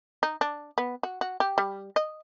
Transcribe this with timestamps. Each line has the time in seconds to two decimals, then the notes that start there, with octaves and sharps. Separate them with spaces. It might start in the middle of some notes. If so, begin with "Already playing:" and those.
0.23 D#4
0.41 D4
0.78 B3
1.03 F#4
1.21 F#4
1.40 G4
1.58 G3
1.96 D#5